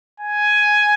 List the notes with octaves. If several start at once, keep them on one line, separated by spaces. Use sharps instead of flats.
G#5